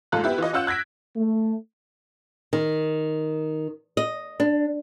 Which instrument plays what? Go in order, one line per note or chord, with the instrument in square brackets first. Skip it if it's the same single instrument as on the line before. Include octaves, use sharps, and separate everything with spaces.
[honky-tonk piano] F#1 G#2 F4 A4 A#5 F#6
B3 E4 G4
E3 F4 D#5
C#4 F4 F#5 E6 G6 E7
F#6 G#6 A#6 B6 D7
[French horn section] A3
[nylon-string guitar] D#3
D#5
D4